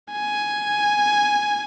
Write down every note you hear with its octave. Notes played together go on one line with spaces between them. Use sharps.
G#5